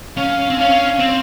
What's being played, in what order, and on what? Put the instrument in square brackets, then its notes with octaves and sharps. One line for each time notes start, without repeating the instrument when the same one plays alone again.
[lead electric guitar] C#4 [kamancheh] F5
[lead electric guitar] C4
[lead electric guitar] C#4 [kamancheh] F5
[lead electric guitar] C4